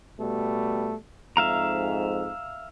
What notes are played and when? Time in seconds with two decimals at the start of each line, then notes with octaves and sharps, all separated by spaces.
0.19 B2 G3 A3
1.37 F2 G#2 E5 F5 A#5